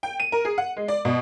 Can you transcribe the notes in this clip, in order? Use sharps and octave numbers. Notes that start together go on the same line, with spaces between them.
G5
D#7
A#4
G#4
F#5
G#3
D5
B2